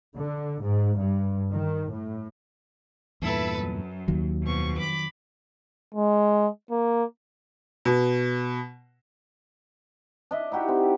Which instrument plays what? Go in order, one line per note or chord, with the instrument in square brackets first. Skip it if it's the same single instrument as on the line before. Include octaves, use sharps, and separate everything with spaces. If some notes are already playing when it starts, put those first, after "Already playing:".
[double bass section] D3
G#2
G2
D#3
A2
[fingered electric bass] E2 G2 A#2 [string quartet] E4 A4 B4
[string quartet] F#2
[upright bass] D#2 [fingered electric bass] D#3 F#3
[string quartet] F2 B2 C#6
B5 D6
[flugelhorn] G#3
A#3
[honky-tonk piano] B2
[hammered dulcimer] D4 D#5 E5
D#4 E4 F#4 G4
C4